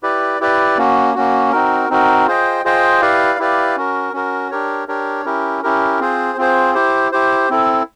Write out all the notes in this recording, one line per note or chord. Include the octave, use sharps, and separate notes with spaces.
E4 G4 B4 D5
E4 G4 B4 D5
A#3 C#4 F#4
A#3 C#4 F#4
C4 D#4 F#4 A#4
C4 D#4 F#4 A#4
F4 G#4 C5 D#5 G5
F4 G#4 C5 D#5 G5
E4 G4 B4 D5 F5
E4 G4 B4 D5 F5
C#4 F#4 A#4
C#4 F#4 A#4
D4 G4 A#4 C#5
D4 G4 A#4 C#5
C#4 E4 G4 A#4
C#4 E4 G4 A#4
C4 F4 G#4 C5
C4 F4 G#4 C5
E4 G4 C5
E4 G4 C5
C4 E4 A4